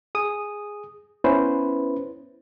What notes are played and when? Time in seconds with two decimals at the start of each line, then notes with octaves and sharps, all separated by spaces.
0.15 G#4 D#6
1.24 B3 C#4 E4 B4 C5